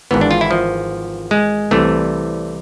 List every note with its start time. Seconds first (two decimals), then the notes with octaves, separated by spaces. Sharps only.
0.11 G#1 G#2 E3 B3
0.21 D4
0.31 F4
0.41 E4
0.51 F3
1.31 G#3
1.71 C2 C3 E3 A3